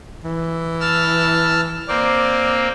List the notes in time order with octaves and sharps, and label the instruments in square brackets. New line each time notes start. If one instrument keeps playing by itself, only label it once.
[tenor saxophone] E3
[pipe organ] A5 E6 F6
[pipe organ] A#3 C4 [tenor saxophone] D5